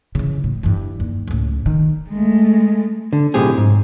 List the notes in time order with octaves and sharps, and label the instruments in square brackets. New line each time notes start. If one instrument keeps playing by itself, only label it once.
[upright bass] C#3 E3
A2
G2 E3
D#2
C#2 A2
D#3
[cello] G#3 A3
[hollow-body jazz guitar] D3
B1 A2 C4 G4 G#4
G#2